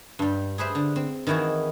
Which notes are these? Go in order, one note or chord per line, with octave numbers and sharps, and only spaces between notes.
G2 G3
G#4 B4 C5 E5
D3
C4
D#3 E3 E4 F#4 G#4